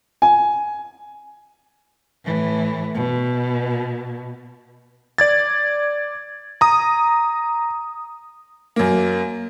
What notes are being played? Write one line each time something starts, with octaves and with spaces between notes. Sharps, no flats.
G#5
A2 E3
B2
D5 G#6 A6
A#5 D#6
F#2 A#3